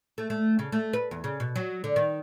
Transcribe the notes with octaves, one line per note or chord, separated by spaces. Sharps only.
A3
A3
C#3
A3
B4
E2
C#3
B2
F#3
D3
D#3